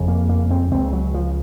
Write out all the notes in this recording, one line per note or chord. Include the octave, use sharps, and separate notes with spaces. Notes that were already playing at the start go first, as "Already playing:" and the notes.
Already playing: F#1 F2 C#3
A#3
A#3
C4
C#2 C#3 C4
F#3
F3